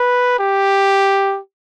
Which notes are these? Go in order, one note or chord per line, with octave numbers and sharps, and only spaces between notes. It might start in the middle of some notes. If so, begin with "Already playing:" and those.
Already playing: B4
G4